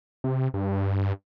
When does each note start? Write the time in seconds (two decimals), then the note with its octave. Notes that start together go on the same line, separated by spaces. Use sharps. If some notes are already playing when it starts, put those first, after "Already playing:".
0.24 C3
0.54 G2